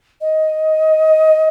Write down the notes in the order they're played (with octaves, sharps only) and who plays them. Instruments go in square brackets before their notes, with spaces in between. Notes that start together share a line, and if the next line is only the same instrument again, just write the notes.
[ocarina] D#5